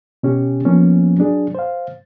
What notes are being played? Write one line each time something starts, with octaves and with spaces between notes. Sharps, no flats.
B2 C#4 G4
F3 A#3 B3 C#4
F#3 D4 G#4
C5 F5